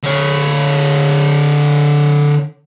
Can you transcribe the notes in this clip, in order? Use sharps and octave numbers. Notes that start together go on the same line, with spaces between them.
D3 C#5